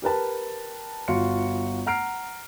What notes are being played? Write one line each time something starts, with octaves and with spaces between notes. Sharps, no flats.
G4 A#4 B4 A5
G1 F4 F#4 C6 C#7
F#5 A#5 F6 C7 D7